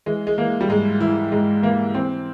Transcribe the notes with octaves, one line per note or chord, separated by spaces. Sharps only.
E3 G#3
G#3
E3 A#3
G3
G#2 G#3
E3 E4
G#2 G#3
E3 A#3
E3 C4